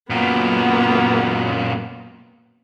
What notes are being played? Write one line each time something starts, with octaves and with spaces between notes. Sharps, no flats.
F#2 A#2 A#3 B3